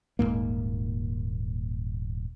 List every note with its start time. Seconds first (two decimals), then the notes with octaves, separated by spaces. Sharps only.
0.19 D#1 C#2 G#2 A#3